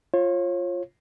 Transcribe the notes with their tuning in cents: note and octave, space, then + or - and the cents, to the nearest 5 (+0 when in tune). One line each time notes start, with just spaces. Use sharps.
F4 +0 C#5 -35